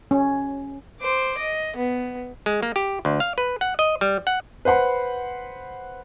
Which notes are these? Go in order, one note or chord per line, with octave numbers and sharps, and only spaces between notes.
C#4
C5 D6
D#5
B3
G#3
A#3
G4
D2
F5
B4
F#5
D#5
G3
F#5
B4 C5 F#5 B5